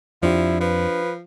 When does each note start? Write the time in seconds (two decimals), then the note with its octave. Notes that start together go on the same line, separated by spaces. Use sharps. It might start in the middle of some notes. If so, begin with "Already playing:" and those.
0.23 F2 F3 D4 E4 F4 G4
0.61 F3 B4